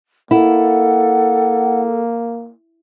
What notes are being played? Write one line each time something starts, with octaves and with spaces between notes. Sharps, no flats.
A#3 E4 A4 F#5